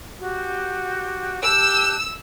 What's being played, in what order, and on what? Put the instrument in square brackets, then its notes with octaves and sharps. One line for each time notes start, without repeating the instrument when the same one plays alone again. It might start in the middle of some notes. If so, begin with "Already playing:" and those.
[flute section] F#4 G4
[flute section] G4 A5 F#6 [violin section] E6